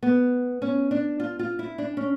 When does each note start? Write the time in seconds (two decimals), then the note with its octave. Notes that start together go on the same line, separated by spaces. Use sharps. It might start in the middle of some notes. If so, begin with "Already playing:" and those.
0.03 B3
0.62 C#4
0.91 D4
1.20 F4
1.39 F4
1.59 E4
1.78 D4
1.97 C#4